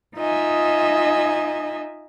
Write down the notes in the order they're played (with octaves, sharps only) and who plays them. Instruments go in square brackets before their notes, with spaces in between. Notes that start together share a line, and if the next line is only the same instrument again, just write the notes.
[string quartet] D#4 F4 D#5 E5 G#5